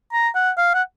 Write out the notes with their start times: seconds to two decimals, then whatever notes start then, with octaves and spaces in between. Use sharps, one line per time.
0.13 A#5
0.35 F#5
0.58 F5
0.74 F#5